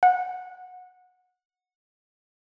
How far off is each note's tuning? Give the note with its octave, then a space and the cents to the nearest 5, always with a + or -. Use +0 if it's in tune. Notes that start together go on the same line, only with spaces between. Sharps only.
F#5 -20